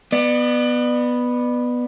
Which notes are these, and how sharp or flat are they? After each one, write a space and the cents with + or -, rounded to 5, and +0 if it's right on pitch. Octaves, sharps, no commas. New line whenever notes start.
B3 +0 D5 +35